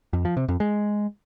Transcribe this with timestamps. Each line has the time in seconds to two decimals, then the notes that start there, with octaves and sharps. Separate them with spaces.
0.13 F2
0.25 F3
0.37 C3
0.48 F2
0.60 G#3